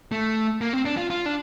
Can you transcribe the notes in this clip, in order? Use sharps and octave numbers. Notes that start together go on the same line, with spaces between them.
A3
A#3
C4
D4
F4
F4
D4